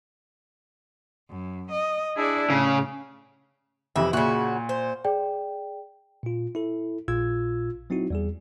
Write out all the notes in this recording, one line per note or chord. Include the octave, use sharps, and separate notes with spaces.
F#2
D#5
D4 E4 G#4 D5
A2 C#3
F2 C3 E3 E4
A#2 C#3 F#4
C5
G#4 D5 G5
A#2 F4
E4 A4
A#1 A#2 F4 E6 G#6
F#3 C4 D#4 E4 F#4
E2 G3 G#4